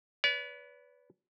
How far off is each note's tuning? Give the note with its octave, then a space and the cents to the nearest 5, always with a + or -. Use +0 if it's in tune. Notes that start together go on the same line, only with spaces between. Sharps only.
B4 +0 D5 -45